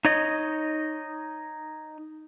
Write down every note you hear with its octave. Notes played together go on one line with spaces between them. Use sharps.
D#4 C#5 D#5